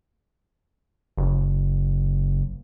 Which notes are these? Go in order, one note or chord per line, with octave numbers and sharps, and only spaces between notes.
F#1